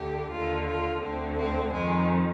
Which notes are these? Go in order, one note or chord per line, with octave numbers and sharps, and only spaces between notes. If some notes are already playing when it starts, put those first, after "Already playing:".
Already playing: D2 D3 G4
D#2 D3 F4
F4
D2 D3 C4
C4
F2 D#3 G#3